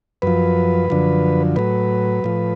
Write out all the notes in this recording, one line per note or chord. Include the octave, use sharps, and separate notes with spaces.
F#2 F3 B4
F#2 D3 F3
A2 F#3 B4
A2 F3